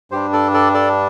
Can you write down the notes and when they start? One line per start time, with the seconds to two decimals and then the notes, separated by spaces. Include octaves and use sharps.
0.11 G2 G3 D4 G4 C5
0.33 A4 D5
0.54 A4 D5
0.74 A4 D5